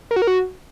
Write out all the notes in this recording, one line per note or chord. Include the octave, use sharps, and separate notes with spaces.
A#4
F#4
A#4
F#4